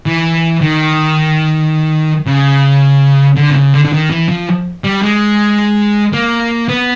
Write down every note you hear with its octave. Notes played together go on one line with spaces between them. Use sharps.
E3
D#3
C#3
D3
C3
C#3
D3
D3
D#3
E3
F3
G3
G#3
A#3
B3